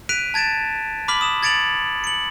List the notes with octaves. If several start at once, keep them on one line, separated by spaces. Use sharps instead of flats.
F#6 B6 D7 D#7 F7
A5 G#6 A6 D7 E7
B5 D6 F6 B6 F#7
D#6 E7
G#6 A6 C#7 D7 F7 F#7
C#7 F#7